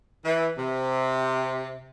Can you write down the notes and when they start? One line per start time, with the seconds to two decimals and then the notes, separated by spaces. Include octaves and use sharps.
0.25 E3
0.58 C3